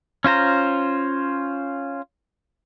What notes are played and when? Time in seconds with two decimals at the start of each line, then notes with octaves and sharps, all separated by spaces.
0.24 C#4 F4 C5 A#5